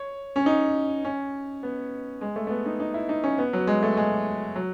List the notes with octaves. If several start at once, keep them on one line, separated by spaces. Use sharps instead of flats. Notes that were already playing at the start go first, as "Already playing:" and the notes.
Already playing: C#5
C#4
D#4
C#4
B3
G#3
A3
A3
B3
D#4
D#4
E4
D#4
C#4
B3
F#3
G#3
A3
G#3
F#3